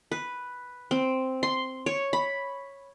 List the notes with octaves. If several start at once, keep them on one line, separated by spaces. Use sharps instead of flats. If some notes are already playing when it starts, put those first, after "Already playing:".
B4
C4
C6
C#5
B5